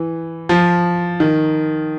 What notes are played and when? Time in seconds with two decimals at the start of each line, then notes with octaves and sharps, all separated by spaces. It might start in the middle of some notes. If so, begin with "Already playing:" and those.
Already playing: E3
0.49 F3
1.20 D#3